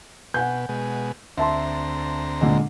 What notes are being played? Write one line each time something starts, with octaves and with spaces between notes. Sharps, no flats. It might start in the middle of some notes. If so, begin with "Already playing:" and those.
B2 F#5 G#5 G6
B2 G#3
D2 C4 E5 A5 A#5 C6
A#2 D3 G#3